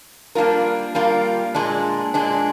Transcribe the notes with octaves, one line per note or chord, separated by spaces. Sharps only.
G3 A#3 D4 F4 A#4
G3 A#3 D4 F4 A#4
A#2 G#3 D4
A#2 G#3 D4